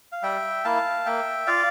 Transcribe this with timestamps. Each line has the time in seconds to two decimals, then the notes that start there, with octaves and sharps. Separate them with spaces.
0.12 F5
0.23 G3 E5 G5
0.64 A#3 E4 F5 A5
1.06 A#3 E5 G5
1.47 F4 D5 F5